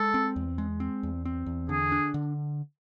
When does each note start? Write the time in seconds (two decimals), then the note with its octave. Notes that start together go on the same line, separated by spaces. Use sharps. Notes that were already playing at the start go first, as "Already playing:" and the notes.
Already playing: G#3 A4
0.14 C4
0.36 E2
0.58 G#3
0.80 C4
1.03 E2
1.25 C4
1.46 E2
1.69 D3 G#4
1.92 D4
2.14 D3